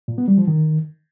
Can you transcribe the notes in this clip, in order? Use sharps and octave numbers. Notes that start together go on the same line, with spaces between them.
A#2
B3
G3
F3
D#3